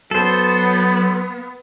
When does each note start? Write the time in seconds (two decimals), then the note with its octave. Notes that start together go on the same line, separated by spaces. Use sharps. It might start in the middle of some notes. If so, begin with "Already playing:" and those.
0.11 F#3 B3 A4 C5